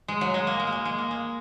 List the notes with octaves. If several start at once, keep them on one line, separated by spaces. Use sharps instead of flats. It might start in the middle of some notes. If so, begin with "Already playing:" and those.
G#3
F#3
G#3
A#3
G#3
A#3
G#3
G#3
A#3
G#3